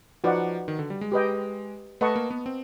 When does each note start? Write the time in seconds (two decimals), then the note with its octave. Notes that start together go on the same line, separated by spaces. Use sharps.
0.24 F3 D#4 F#4 B4 D5 F#5
0.68 D#3
0.79 D3
0.90 G3
1.01 G#3
1.12 G4 B4 D#5 G5
2.01 A3 B4 D#5 F#5 A5 C#6
2.16 A#3
2.30 B3
2.46 C4